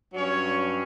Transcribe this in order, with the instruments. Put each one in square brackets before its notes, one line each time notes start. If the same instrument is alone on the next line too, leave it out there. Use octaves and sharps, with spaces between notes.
[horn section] G2 F#3 C#4 C#5